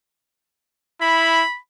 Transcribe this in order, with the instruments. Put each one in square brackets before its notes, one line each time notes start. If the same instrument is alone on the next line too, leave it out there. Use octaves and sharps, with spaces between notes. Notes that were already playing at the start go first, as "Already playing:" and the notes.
[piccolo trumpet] E4 [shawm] B5